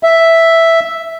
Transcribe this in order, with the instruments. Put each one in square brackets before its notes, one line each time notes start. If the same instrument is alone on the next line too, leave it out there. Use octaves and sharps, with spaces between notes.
[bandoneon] E5